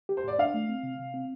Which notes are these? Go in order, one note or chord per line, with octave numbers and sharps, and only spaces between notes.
G4
C5
A2 D5
D4 F5
A3
C4
C3
C3
C4